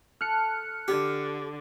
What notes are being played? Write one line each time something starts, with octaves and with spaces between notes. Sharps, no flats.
A4 F6 F#6 C#7
D3 G4